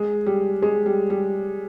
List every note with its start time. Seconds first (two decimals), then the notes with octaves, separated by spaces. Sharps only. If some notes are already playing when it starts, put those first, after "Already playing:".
Already playing: G#3
0.26 G3
0.62 G#3
0.86 G3
1.10 G3